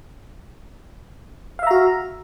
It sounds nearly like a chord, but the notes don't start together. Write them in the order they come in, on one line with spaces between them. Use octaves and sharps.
F5 E5 A#5 F#4